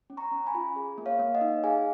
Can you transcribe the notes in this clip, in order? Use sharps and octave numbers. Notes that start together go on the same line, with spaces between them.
C#4
A#5 C#6
C#4
G#5 B5
F4
G#4
A#3
C#5 F5
A#3
D#5 F#5
D#4
G#4 F5 G#5